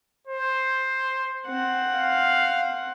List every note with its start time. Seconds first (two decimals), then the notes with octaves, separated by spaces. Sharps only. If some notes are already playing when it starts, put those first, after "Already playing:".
0.27 C5
1.47 C4 F#5
1.92 F5